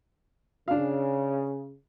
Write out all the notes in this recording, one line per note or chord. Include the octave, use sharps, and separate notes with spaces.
C#3 D4 F5